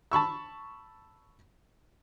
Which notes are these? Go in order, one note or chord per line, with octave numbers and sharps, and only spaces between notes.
A5 B5 C#6 E6